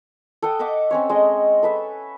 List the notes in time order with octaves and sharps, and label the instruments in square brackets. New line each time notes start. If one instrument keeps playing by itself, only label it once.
[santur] A4 F#5 G5 D#6
D#5 E5 F#5 D6
C4 C#4 C#5
G#3 D#5
A4 B4 E5